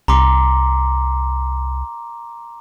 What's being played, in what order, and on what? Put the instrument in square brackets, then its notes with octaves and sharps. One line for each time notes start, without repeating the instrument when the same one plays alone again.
[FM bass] C2 [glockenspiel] A#5 C6 D6